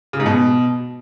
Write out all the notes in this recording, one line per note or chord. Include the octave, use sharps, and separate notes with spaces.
C#3
G#2
B2